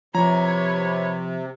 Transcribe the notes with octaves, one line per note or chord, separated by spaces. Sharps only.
C3 F3 B4 C#5 A#5